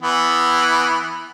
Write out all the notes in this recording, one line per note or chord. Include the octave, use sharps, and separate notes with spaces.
E3 B3